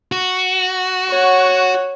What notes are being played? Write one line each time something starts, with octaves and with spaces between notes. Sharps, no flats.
F#4
C#5 F#5